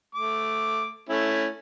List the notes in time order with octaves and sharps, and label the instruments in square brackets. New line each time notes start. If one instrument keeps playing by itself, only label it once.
[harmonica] A3 D6
A3 C#4 E4